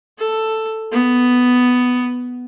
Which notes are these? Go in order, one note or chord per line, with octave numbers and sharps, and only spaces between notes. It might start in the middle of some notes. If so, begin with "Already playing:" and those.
A4
B3